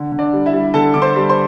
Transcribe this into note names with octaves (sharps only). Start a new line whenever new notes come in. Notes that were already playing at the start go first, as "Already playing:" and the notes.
Already playing: D3
D3
D4 D5
G3
E4 E5
G3
D3 A4 A5
D3 D6
C5 C6
G3
C5 C6